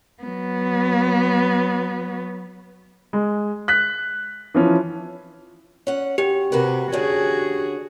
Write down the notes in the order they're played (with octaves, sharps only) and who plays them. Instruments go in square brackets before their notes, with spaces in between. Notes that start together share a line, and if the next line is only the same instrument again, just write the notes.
[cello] F#3 B3
[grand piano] G#3
F#6 B6
E3 F3 C#4
[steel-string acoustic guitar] C#4 F#5
[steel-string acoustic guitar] F#2 [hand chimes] G4
[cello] C3 [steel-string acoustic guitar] F#4 A#4 B4
[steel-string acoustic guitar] D3 C#4 [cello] F#4 G#4